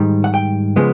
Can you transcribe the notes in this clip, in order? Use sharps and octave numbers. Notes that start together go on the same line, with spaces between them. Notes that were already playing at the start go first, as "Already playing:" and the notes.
Already playing: G#2 D#3 G3
F#5
G5
C#3 F3 G#3 B3